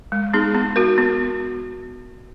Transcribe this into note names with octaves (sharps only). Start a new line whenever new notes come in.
G#3
B3 D#4 G#4
B3
F#4 A#4
B3